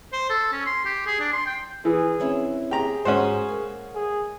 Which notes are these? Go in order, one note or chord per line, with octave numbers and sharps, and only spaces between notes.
C5
A4
C#4
C6
G4
G#4
D4
C6
G5
E3 G#4
C4 C#4 E4
G4 G#4 A#5
G#2 C#4 F#4 C5
G#3 A#3
G#4